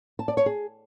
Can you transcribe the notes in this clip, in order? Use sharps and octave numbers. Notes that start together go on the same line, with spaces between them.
A5
D5
C#5
G#4